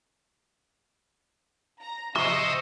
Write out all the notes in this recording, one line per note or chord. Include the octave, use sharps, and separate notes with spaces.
A#5
C5 D#5 E5 C#6